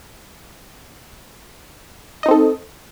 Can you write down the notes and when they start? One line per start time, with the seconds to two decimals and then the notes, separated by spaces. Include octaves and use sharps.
2.23 D#5
2.26 D#4
2.28 C4
2.31 A4